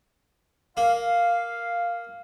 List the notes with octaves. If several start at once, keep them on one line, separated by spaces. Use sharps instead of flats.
A#3 F5